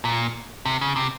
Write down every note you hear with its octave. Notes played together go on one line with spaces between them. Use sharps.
A#2
C3
C#3
C3